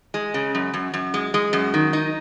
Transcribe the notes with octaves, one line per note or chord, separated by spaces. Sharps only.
G#3
C#3
F#2
F#2
F#2
G#3
G#3
F#2
D#3
D#4